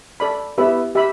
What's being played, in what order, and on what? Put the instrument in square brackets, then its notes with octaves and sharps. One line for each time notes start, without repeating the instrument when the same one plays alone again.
[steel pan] A4 D5 B5
[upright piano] B3 E4 [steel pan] G4 E5 B5
[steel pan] G4 E5 B5